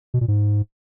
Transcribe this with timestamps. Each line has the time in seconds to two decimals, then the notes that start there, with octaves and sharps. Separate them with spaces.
0.14 B2
0.21 A#2
0.28 G#2